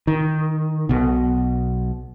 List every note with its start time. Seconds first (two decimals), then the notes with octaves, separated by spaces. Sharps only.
0.07 D#3
0.89 B1 B2